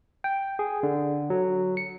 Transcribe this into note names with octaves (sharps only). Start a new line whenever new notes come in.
G5
G#4
D3
F#3
C#7